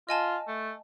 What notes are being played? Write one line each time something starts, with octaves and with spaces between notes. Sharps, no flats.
F4 D#5 G#5 A5
A3